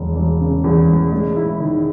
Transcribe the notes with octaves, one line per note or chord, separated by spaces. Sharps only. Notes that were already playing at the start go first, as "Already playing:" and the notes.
Already playing: E1 E2
E1
C#3
E2
E1
G#3
E4
D#3